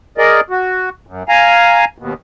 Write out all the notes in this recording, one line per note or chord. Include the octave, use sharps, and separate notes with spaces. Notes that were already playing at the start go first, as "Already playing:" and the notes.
G#4 A#4 D5 D#5
F#4
F#2
F5 G#5 A#5
D#2 B2